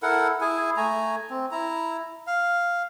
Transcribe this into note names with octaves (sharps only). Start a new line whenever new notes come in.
E4 A4 A#4 F#5
E4 G#4 G#5
A3 G#5 A#5
C4
E4 A#5
F5